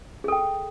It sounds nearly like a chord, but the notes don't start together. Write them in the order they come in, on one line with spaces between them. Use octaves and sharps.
G#4 A4 G5